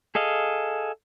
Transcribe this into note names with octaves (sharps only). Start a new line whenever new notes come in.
G#4 A4 D#5 F5